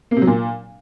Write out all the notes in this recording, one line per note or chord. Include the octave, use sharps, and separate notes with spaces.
A#3
C3
F#3
A#2